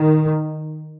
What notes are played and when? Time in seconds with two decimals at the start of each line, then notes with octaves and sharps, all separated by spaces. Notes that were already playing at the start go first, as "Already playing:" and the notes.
Already playing: D#3